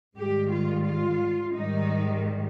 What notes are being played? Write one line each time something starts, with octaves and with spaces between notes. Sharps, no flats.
G#2 D#3 G3 G4
F4
F4
G#2 D#3 G3 D#4